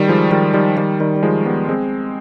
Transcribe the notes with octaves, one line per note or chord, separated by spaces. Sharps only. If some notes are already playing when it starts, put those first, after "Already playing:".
Already playing: D#3 G3
F3 G#3
D#3 G3
D#3 G3
D#3 G3
D#3 G3
G3
F3 G#3
G3 B3
G#3 C4